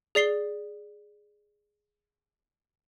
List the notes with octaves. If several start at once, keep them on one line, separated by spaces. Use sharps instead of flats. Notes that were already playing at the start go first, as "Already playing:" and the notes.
G#4 D5 C7 G7